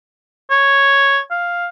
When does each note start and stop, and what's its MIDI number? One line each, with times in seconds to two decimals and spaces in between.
0.50 1.19 73
1.30 1.67 77